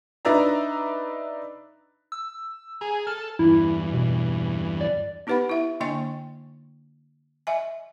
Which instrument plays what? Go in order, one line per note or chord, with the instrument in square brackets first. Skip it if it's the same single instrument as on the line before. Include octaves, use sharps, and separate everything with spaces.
[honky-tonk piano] D4 D#4 B4 D5 E5 A#5
[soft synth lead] E6
[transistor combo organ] G#4 [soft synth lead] A#5
[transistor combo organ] A4 [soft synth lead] F6
[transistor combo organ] E2 G2 [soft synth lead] E4
[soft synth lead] B2
D5
[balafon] B3 D#4 G4 B4 F#5 B5
E4 E5
D3 A#3 D4 D#5 G5 C#6
D#5 E5 G#5